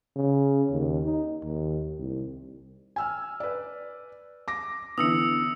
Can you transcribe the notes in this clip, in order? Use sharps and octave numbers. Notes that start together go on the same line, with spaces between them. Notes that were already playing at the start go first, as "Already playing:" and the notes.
C#3
D#2
D#4
D#2
C2
G#5 E6 F6
B4 D5
D6 A#6
D3 E3 B3 D#6 E6 C#7